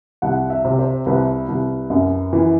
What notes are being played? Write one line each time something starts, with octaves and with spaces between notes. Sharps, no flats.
C2 F#5
E5
C3
C5
C2 B4
C2
F#2
E3